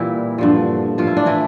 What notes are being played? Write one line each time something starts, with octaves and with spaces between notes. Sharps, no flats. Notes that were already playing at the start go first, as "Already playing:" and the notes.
Already playing: A#2 E3 G3 E4
G2 D3 F3
A2 F3 F4
E4
D4
E3 E4